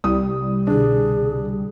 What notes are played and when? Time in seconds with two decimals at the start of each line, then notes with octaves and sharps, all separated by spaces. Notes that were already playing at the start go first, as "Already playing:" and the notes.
0.04 C2 G3 E4 D#6
0.67 B2 D3 D4 G#4